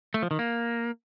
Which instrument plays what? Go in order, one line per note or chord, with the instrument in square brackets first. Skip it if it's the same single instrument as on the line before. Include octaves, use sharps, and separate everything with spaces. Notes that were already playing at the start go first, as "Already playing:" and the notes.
[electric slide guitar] A3
F3
D#3
A#3